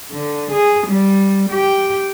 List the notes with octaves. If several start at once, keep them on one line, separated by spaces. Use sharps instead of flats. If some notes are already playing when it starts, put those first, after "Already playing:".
D3
G#4
G3
G4 G5